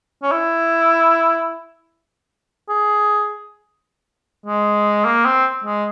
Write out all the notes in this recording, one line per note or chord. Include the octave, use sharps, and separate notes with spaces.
C#4
E4
G#4
G#3
A#3
C4
G#3